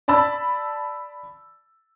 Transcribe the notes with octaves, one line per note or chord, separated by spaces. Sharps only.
D5 A5 B5 E6 A6